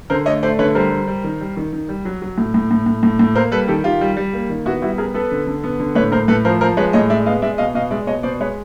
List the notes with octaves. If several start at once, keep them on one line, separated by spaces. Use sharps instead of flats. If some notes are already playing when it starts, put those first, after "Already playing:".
D3 A#4 C5
A3 C#5 D#5
A3 C5 D5
D3 B4 C#5
G3 A#4 C5
G3
G3
D#3
G3
D#3
D#3
G3
F#3
F#3
A2
A2
A2
A2
A2
A2
A#3 A#4 C5
G3 A4 B4
D#3 G4 A4
D#3 F4 G4
G3
G3
A#3
D#3
B3 E4 F#4
G3 E4 F#4
B3 G#4 A#4
B3 A4 B4
D3
D3
B3
D3
A2 B4 C#5
A2 A#4 C5
A2 A4 B4
F3 A#4 C5
F3 A#4 C5
G#3 B4 C#5
A2 C#5 D#5
G#3 D5 E5
B3 D#5 F5
G#3 D5 E5
B2 D#5 F5
B2 D#5 F5
G#3 D5 E5
B2 C#5 D#5
B2 C5 D5
G#3 B4 C#5